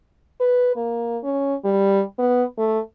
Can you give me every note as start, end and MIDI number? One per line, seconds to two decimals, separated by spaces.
0.40 0.76 71
0.76 1.18 58
1.23 1.55 61
1.65 2.03 55
2.19 2.44 59
2.58 2.80 57